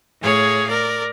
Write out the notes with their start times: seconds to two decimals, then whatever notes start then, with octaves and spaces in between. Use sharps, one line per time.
0.21 A2 G#4 C#5 F5
0.69 A#4 D5